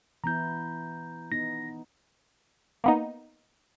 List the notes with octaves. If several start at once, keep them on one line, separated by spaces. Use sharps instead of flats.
E3 B3 E4 A#5 G6
B3 D#4 A#6
A#3 B3 D#4